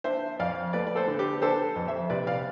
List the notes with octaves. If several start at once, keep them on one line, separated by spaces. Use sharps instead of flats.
D4 C5 E5
F2 D5 F5
A3 B4 D5
D5
A4 C5
D3
G4 B4
D4 A4 C5
F2
C5 E5
C3 B4 D5
D5 F5